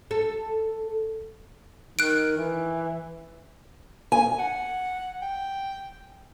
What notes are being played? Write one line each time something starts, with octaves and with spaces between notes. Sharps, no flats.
A4
D#3 F#6 D7
E3
G#5
F#5
G5